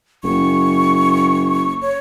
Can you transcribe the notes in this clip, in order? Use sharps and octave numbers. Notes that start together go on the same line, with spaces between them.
F#1 C#6
C#5